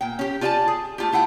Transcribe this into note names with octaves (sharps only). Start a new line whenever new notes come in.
A#2 G5
C#4 G4
F4 G4 D5 E5 G#5 A5
G#4
A3 F4 G4
A3 E4 F#5 G5